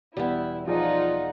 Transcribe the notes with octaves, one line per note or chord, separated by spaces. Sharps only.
E1 G3 B3 E4
F3 D#4 F4 G#4 D5 F#5 G#5